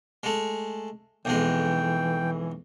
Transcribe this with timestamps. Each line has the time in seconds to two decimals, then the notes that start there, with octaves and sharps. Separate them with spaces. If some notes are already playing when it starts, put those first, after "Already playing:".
0.23 G#3 A3
1.25 B1 F2 E3 G#3 G5